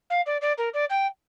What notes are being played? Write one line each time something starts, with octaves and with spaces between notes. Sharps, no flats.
F5
D5
D5
A#4
D5
G5